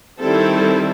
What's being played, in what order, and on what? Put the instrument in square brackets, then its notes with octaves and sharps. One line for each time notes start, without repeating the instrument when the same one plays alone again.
[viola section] D#3 G3 C4 E4 A4